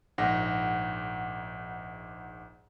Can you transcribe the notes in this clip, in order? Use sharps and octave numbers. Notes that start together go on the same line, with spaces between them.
A#1 G#2 F#5 A#6